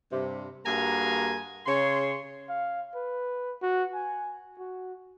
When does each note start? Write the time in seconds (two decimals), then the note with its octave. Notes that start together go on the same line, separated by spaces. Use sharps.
0.12 G2 C3
0.65 G2 A#3 F#4 G#4 G#5 A#5
1.66 C#3 C#5 C6
2.49 F5
2.95 B4
3.62 F#4
3.94 G#5
4.58 F#4